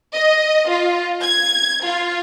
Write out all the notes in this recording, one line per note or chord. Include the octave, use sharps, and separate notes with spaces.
D#5
F4
G#6
F4